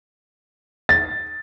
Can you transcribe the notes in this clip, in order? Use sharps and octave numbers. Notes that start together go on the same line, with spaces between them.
A6